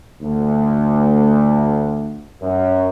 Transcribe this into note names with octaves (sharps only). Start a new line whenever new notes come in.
D2
F#2